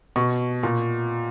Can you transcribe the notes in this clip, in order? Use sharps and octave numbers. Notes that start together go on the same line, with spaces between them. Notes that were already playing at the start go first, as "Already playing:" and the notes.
B2 C#6
A#2